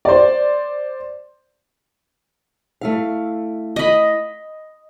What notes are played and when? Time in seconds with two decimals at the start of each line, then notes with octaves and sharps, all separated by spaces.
0.05 C5 D5
2.81 A3 E4 F5
3.76 D#5 B5